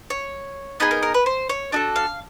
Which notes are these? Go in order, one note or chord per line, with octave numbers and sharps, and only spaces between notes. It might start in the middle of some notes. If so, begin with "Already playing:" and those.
C#5
B3 D#4 G#4 B4
A#4
A#4
B4
C5
C#5
D4 F#4 A4 D#5
F5